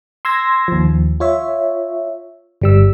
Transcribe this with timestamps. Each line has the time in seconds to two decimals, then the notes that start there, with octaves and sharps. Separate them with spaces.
0.25 C6 E6 G#6 A#6
0.68 D#2 F3
1.20 F4 C#5 E5
2.62 G1 G3 E6